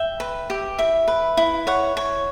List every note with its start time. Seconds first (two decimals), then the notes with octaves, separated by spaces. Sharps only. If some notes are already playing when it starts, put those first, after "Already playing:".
Already playing: E5 G5
0.20 B4
0.50 G4
0.78 E4 E5
1.08 B4
1.37 E4
1.67 C#5 F#5
1.97 C#5